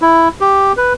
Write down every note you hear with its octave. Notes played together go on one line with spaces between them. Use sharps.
E4
G4
B4